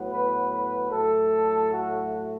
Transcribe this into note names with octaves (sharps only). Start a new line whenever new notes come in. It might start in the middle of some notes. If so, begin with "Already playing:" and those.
Already playing: A2 F#3 B3
B4
B4
A2 F#3 A3 A4
F#4